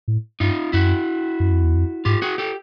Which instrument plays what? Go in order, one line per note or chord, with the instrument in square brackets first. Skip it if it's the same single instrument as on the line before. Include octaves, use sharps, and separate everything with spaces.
[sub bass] A2
[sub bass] G2 [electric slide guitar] D#4 F4
[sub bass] F#2 [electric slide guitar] E4 F#4
[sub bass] F#2
F2
E2
F2
[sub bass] G#2 [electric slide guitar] F4 G4
[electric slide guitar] F#4 G#4
G4 A4